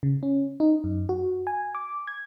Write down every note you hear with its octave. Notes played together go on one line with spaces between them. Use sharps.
C#3
C#4
D#4
F#2
F#4
G#5
D6
G#6